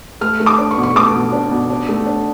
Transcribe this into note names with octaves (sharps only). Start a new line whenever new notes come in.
A3 F6
A3
D6
D4
C#6
B2
C#6
A3 D6
B2
D4
B2
D4
A3
D4